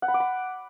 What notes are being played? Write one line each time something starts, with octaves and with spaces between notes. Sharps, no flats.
F#5
B5
D6
B5